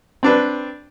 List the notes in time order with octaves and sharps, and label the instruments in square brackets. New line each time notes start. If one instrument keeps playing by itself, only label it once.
[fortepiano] C4 D4 B4